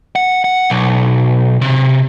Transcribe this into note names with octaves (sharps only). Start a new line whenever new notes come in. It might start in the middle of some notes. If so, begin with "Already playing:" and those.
F#5
F#5
B1
C3